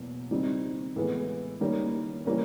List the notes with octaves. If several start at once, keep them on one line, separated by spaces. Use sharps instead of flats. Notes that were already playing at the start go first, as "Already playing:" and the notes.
Already playing: E2 B2 F#3 A#3
D#3 G3 C4 D#4
A2 E3 G#3 B3
D#3 G3 A#3 C#4
E3 G3 A#3 C#4